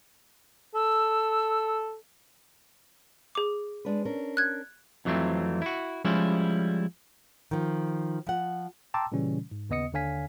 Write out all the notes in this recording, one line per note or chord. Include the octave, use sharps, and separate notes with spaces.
A4 E6
G#4 D6
G#3 D4 B4
C#4 D4 A#4
F#6 G#6
F2 E3 F#3 A3 C4
E4 F#4
F3 G3 G#3 C#4 E4
D#3 F3
F3 F#5
G5 A5 A#5 C6 D6 E6
A#2 C#3 E3 G3 C#4
G#2
D#2 C#3 B3 D#5 D#6 C#7
D#2 D3 C#5 F5 G#5 B6